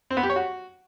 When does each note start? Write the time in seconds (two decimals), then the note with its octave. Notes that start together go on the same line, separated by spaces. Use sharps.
0.11 C4
0.17 B3
0.23 G4
0.30 C#5
0.36 F#4